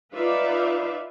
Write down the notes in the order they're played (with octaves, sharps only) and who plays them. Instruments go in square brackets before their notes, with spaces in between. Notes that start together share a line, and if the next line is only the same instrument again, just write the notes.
[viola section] D#4 F4 B4 D5 E5 F5